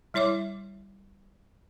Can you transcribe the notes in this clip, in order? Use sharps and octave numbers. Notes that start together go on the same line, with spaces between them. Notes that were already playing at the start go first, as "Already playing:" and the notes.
G3 E4 C#5 E5 D6